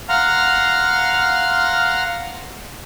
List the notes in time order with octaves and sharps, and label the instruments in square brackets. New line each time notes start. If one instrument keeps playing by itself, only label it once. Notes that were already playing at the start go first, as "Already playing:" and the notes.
[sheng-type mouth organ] F5 F#5 A#5 C6 F6